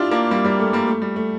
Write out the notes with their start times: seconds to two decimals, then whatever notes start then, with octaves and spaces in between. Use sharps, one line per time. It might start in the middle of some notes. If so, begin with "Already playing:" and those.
Already playing: D4 E4 F4 G4
0.11 A#3 D4
0.31 G3 A#3
0.44 G3 A#3
0.59 A3
0.73 G3 A#3
0.87 A3
1.02 G3
1.16 A3